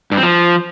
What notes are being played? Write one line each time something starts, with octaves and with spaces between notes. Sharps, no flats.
G2
C4
F3